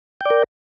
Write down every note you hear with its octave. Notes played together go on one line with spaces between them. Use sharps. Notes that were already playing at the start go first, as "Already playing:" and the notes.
A#4 D5 G5